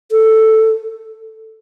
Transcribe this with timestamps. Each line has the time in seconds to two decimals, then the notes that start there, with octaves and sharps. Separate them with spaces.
0.11 A4